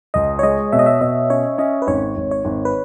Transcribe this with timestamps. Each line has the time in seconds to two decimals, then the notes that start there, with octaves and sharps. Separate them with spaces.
0.14 C#2 D#5
0.39 C#5
0.43 G#3 D#5
0.72 B2 E5
0.79 D#5
0.86 E5
1.00 B2 D#5
1.30 C#4 C#5
1.58 C#4 D#5
1.82 B4
1.87 G#1 C#5
2.17 G#1
2.31 C#5
2.45 G#1
2.65 B4